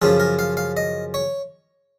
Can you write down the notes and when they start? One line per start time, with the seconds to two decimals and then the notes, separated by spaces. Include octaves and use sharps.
0.02 F#2 C#3 F3 G#4
0.20 A#4
0.39 F5
0.57 F5
0.77 D#5
1.14 C#5